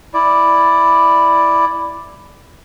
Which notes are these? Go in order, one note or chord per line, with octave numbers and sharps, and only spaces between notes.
E4 D5